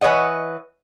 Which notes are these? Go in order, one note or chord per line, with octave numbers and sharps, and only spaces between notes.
E3 B4 C#5 D#5 F#5